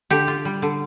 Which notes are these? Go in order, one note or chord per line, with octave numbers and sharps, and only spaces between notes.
D3 G4
F4
G3
D3